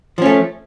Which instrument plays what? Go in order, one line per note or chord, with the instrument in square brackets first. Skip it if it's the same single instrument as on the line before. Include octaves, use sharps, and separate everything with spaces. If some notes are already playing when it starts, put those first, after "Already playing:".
[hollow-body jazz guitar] F3
C#4
A3